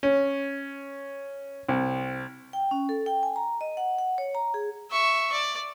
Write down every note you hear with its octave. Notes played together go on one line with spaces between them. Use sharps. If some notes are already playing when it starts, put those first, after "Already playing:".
C#4
C2
G5
C#4
A4
G5
G#5
A#5
D#5
F#5
F#5
C#5
A#5
G#4
E5 C#6
D5